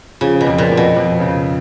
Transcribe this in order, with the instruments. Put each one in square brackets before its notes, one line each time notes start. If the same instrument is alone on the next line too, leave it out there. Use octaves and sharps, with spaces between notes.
[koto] C#3 [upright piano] F3
[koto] B2
[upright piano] F2
[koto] A#2
[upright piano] F2
[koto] B2
[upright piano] F2
C#3